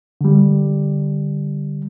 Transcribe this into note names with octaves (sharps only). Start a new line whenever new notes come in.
D3 G3